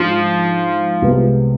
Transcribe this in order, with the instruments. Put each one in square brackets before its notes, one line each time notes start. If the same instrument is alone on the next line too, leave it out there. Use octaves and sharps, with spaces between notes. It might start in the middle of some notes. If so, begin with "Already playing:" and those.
Already playing: [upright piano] G#2 G#3 D4 F4 [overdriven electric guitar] F3
[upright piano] C2 C3 G#3 B3 F4